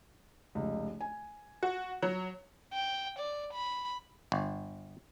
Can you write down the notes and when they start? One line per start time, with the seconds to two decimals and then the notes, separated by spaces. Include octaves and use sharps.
0.55 F1 C#2
1.01 G#5
1.63 F#4
2.03 F#3 C#5
2.74 G5
3.19 D5
3.54 B5
4.32 G1